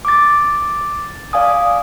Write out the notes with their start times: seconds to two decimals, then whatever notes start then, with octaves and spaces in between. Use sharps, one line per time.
0.05 D6 A6
1.33 D5 F5 G#5 D#6